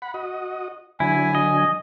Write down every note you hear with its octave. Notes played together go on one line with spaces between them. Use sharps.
F#5 B5
F#4 D#5
D3 F#3 E4 G#5
D#5